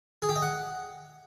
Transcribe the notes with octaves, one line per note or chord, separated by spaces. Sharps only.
G#4
G4
D#5
F#5